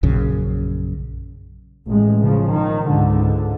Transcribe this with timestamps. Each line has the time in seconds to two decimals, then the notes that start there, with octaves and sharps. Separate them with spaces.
0.03 A#1 F#2 C#3
1.87 A1 A2 G#3
2.21 C#3 F3
2.51 D#3
2.89 C#2 G#2 D3